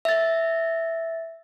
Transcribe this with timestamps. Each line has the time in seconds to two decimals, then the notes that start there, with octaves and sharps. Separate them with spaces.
0.05 E5 A6